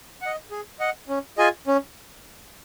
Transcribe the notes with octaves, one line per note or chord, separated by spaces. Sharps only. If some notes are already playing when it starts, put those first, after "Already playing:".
D#5 F#5
G#4
D#5 F#5
C#4
F4 G#4 D#5 G#5
C#4